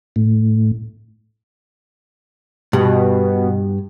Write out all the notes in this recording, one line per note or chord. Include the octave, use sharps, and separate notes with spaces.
A2
G2 B2